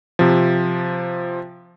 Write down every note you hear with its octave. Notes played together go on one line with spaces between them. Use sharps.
C3 F3